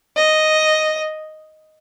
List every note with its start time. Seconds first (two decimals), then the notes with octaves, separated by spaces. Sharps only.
0.16 D#5